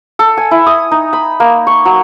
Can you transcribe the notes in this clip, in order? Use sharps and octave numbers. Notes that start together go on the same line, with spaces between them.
A4
G#5
E4
D#6
D#4
B5
A#3
C#6
F#3